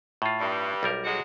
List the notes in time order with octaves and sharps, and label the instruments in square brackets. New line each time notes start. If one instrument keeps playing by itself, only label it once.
[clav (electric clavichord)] A2 F4
[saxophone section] G2
[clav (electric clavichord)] B1 G3 A#4
[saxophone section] F#3 G#3 F#4